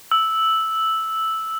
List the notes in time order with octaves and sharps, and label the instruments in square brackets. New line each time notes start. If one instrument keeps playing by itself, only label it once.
[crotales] E6